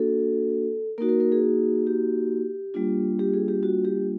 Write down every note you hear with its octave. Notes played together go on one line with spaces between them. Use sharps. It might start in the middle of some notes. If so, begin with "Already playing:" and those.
Already playing: A#3 D4 F#4 A4
A#3 D#4 F#4 A#4
A#4
A#4
G#4
G4
G3 A#3 D4 F4
G4
G#4
G4
F#4
G4